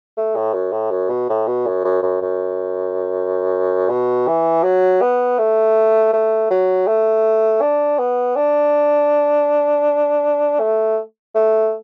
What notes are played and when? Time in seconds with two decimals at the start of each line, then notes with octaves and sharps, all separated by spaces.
0.17 A3
0.36 A2
0.54 F#2
0.73 A2
0.91 F#2
1.10 B2
1.29 A2
1.47 B2
1.67 F#2
1.84 F#2
2.03 F#2
2.22 F#2
3.90 B2
4.28 E3
4.64 F#3
5.02 B3
5.39 A3
6.13 A3
6.51 F#3
6.88 A3
7.62 D4
7.99 B3
8.36 D4
10.60 A3
11.35 A3